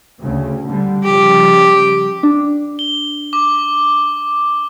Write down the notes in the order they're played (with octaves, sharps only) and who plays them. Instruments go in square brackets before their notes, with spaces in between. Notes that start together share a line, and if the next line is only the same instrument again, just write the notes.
[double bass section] D2 C#3
D3 G3
[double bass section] C#3 F3 G3 [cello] G4
[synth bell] D4
[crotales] G7
D6